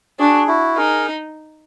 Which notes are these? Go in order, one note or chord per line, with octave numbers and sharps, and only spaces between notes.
D4 F#4 G#4
E4 F#4
D#4 G#4 A#4